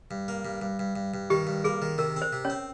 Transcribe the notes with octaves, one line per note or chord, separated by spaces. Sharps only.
G2
A#3
G2
G2
G2
G2
G2
D#3 G4
G2
A#3 G#4
D#3
C3 A#4
C4
C5
C3
C#4 C#5
C4